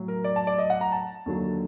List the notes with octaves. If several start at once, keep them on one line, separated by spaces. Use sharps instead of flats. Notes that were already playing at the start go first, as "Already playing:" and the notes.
Already playing: A2 F#3
A#4
D5
A5
D5
D#5
F#5
A#5
A5
D#2 D3 F#3